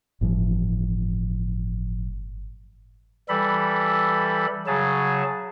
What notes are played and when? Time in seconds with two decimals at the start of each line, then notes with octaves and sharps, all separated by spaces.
0.21 G1 A2 E3 F3
3.29 E3 G3 A4 B5
4.67 C#3 F#3 G#4 A5